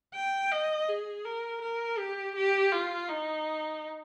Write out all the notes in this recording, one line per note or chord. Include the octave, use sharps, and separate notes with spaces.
G5
D#5
G#4
A#4
A#4
G4
G4
F4
D#4